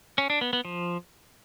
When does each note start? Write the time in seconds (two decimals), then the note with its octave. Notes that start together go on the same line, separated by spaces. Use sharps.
0.18 C#4
0.30 D4
0.41 B3
0.53 B3
0.65 F3